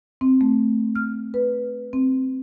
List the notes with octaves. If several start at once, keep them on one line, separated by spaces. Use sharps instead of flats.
C4
A3
F6
B4
C4